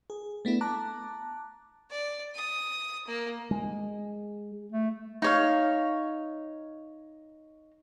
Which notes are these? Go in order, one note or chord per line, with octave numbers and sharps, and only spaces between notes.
G#4
A3 B3 D4 E4
A5 A#5 D6 F#6
D5
D#6
A#3
G#3
A3
D#4 C#5 F5